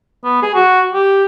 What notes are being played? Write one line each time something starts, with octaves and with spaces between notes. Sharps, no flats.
B3
G#4
F#4
G4